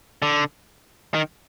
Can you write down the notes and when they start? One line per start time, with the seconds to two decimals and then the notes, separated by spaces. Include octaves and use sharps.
0.22 D3
1.14 D#3